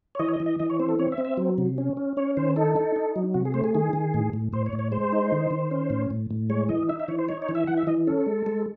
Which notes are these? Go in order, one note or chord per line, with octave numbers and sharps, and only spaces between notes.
C#5
E3 D#5
C#5
D#5
E3
D#5
E3 D#5
C#5
C4 C5
A4
C4 C#5
E5
C4
E5
F#3
C3
C#4
C#4
C#4 C#5
D#3 C5
D#4 A4
D#4
D#4
F#3
C3 F#4
G#4
A3 C5
G#4
D#3 G#4
D#3
A2
A2
A2 C5
C#5
A2
C#5
G#3 C5
D#4
D#3
D#3
C#4
A2
A2
A2
G#3 C#5
E3 D#5
D#4 E5
E5
E3 C#5
C5
D#4 C#5
C#5
E3
E5
E3 F#5
E5
E3 D#5
C#4 A4
G#3
G#3